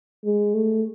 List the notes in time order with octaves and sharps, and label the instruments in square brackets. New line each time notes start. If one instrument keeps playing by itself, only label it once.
[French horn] G#3
A3